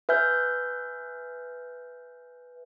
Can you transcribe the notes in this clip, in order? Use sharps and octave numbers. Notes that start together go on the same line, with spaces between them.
B4 E5 G#5 F6 G6